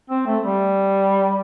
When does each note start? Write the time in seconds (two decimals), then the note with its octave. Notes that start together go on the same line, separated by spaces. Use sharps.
0.10 C4
0.27 A3
0.44 G3